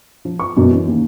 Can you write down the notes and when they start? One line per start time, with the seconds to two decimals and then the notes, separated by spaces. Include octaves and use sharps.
0.25 F3
0.39 C#6
0.57 F#2 B2
0.71 E3 C#4
0.88 D#2